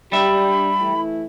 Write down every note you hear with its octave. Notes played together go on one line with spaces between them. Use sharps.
G3 D4 G4 E5 B5
E3 A3 E4